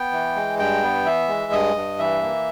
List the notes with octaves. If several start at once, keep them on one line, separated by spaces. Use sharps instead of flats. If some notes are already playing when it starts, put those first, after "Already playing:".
Already playing: B3 G5
E3
G#3
G2 G5
B3
E3 E5
G#3
G2 D#5
G2
E3 E5
A#3